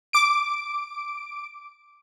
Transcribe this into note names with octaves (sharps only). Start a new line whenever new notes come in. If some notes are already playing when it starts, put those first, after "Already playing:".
D6 D7